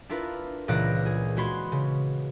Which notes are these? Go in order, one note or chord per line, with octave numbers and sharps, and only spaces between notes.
D4 E4 F4 A#4 B4
C#2 A#2 E3 D5 F#6 A#6
G#4
G#3 F#4 B4 C6 G#6
C#3